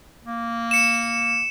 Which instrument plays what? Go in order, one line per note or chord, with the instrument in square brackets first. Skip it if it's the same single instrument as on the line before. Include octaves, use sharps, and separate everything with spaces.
[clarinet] A#3
[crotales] C#7 E7